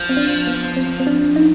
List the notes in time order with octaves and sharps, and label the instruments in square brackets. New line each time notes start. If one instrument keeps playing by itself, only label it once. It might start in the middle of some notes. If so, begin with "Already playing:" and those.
Already playing: [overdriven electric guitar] F3
[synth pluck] C4
D4
B3
C4
C4
D4
D#4